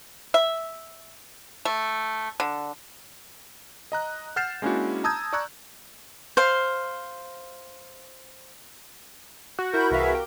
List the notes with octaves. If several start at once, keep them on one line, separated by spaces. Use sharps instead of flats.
E5
A3
D3
D#5 A#5 F#6
F#5 F6 G6 A6 C7 E7
G#3 A#3 C#4 D4 E4 F#4
A5 A#5 D#6 E6 G6 G#6
D5 A#5 C#6 E6 F#6 G#6
C5 F5
F#4
E4 A#4 B5 G6
C2 E3 G#4 B4 E5 F5
G4 G5